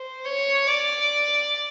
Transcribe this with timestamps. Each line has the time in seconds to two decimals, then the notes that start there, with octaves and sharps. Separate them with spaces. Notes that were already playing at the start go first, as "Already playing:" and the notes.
Already playing: C5
0.25 C#5
0.67 D5